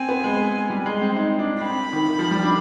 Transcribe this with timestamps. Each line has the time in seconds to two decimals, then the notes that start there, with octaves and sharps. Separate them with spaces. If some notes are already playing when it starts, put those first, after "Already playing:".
Already playing: C4 G#5
0.09 B3
0.24 G#3
0.70 G3
0.86 G#3
1.01 C4
1.16 D#4
1.39 D4
1.62 C4 B5
1.93 D#3
2.09 D#3
2.19 F3
2.31 G3
2.43 D4